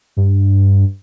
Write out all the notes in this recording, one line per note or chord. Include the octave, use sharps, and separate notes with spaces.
G2